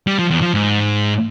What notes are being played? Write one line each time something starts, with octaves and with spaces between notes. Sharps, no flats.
G3
F3
E2
F3
G#2